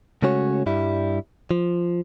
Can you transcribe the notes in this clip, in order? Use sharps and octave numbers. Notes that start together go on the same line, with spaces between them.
C#3 G#3 A3 C#4 F#4 C#5
G2 G3 E4
F3